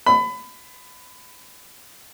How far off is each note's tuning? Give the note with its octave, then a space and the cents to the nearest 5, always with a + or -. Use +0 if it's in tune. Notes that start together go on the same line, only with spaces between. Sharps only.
B5 +25